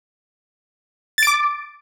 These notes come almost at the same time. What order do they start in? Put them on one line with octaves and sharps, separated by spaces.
A6 D7 D6